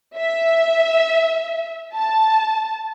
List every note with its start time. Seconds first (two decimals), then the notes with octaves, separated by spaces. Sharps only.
0.16 E5
1.94 A5